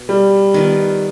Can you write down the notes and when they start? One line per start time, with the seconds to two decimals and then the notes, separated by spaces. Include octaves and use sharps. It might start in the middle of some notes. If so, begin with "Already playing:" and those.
Already playing: B2
0.09 G3
0.54 D#3 B3 F4